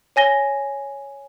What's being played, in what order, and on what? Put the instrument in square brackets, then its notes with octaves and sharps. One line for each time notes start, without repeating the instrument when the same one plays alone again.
[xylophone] C#5 G#5 A#6 G7